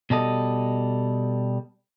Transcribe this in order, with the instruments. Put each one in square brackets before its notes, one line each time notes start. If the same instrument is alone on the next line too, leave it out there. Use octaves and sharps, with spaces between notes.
[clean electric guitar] B2 G3 A4 D#5